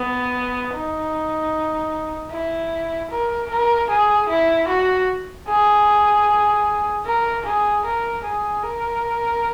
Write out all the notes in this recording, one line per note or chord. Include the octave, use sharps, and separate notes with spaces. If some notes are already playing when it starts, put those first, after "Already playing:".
Already playing: B3
D#4
E4
A#4
A#4
G#4
E4
F#4
G#4
A#4
G#4
A#4
G#4
A#4